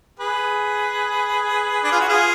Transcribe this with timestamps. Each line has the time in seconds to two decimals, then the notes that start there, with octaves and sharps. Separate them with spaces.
0.19 G#4 B4
1.84 D4
1.92 F4
2.00 F#4
2.09 F4 G#4